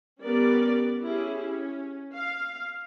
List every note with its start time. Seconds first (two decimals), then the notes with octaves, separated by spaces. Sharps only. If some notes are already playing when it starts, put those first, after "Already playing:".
0.21 G3 B3 C#4 G4 A#4 D5
1.02 C#4 E4 G4 G#4
1.47 C#4
2.15 F5